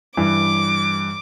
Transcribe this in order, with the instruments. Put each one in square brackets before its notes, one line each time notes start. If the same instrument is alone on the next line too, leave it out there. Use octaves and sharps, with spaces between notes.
[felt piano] G2 E3 [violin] D6